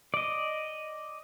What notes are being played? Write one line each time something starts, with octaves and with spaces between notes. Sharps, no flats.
D5 D#5